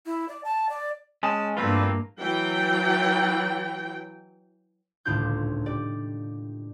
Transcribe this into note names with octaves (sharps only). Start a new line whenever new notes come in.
E4
D5
A5
D5
G#3 C#4 A5
G2 E3 A3 A#3 C4 D4 F4 B4
E3 F#3 G5
D#1 C#2 A2 D4 F4 G6
G4 D5